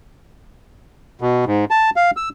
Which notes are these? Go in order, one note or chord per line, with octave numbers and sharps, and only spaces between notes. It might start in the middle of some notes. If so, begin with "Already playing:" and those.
B2
G#2
A5
F5
E6